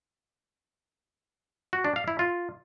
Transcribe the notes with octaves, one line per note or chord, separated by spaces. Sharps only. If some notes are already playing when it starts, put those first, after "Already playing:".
F#4
D4
F5
E4
F4